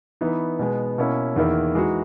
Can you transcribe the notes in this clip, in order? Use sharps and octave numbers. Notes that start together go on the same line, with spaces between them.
E3 B3 D#4
B2 G#3 B3
B2 A#3 C#4 E4
E2 D#3 A#3 E4
E3 G#3 D#4 F#4